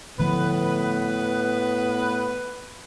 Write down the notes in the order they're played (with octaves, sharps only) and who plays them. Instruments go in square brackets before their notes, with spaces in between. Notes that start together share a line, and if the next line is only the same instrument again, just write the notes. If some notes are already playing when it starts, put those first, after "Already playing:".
[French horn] A2 [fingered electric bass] D3 F3 A3 [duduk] B3 [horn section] B4